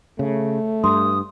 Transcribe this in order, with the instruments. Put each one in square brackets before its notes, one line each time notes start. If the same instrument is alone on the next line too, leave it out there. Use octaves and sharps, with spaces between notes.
[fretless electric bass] C#3 [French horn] A3
[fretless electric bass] G2 [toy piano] C6 [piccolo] D#6